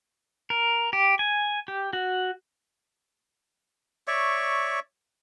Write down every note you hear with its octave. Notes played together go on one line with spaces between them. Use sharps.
A#4
G4
G#5
G4
F#4
C#5 D5 E5 C#6